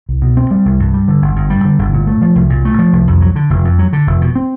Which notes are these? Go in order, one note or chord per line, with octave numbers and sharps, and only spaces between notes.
C2
B2
C4
G3
C2
G2
G3
D3
G1
G2
G3
D3
G1
A#2
A3
F3
C2
A#2
A3
F3
C2
F2
F#3
D3
F1
F2
F#3
D3
F1
B2
C4